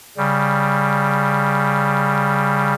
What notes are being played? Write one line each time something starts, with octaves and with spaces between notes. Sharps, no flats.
C#3 G3